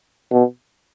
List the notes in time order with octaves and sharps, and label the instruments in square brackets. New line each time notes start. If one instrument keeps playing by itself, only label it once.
[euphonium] B2